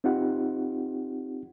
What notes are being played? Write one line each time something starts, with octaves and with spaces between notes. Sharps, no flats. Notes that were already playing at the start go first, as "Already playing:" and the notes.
C4 D#4 F4 G4 F#5